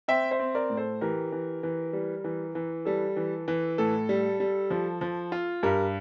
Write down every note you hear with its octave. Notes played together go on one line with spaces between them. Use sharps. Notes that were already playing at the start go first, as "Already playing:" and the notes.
C4 E5 G5
C5 E5
C4
A#4 D5
A2
A4 C5
E3 G4 A#4
E3
E3
G3
E3
E3
G3 A4
E3
E3
A2 A4
G3
G3
F3
F3
F4
G2 G4 A#4